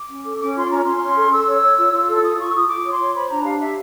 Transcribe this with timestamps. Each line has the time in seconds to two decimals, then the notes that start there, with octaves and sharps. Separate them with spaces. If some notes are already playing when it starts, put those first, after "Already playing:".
Already playing: D6
0.09 C#4
0.26 A4
0.40 C#4 D6
0.55 F4 C6
0.70 C#4 A#5
0.85 C#4 C6
1.02 C#4
1.16 A4
1.31 A4 E6
1.47 C#5
1.62 C#5
1.77 F4
1.93 F4
2.08 A4
2.24 F4 D#6
2.38 F4 C#6
2.50 E6
2.53 F4 D#6
2.69 F4 D6
2.85 C#5
2.92 C6
3.00 C#5
3.14 C5 B5
3.30 D4 A#5
3.45 G4 F5
3.60 G4 E5